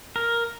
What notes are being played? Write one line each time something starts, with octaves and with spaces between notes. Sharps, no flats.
A#4